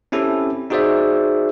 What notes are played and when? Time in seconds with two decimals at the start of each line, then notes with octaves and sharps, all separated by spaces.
0.12 C4 C#4 E4 G4 A4
0.70 D#4 F#4 G#4 C5 D5 E5